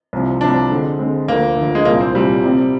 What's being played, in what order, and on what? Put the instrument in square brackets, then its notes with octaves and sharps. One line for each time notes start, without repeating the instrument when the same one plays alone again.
[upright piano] C2 C3 F3
[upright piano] C2 C3 F3 [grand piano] D4
[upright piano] D3 G#3 C4
D3 G#3 C4
[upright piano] D2 D3 F3 [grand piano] A#3
[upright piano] D2 D3 F3
[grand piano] G#3
[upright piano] C2 A#2 F3 C4 [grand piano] A#3
[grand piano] C4
[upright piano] C2 A#2 F3 C4 [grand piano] G3
[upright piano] C3 G3 C4 G4